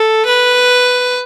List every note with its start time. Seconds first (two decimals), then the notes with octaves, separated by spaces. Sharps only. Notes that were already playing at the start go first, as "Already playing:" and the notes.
Already playing: A4
0.25 B4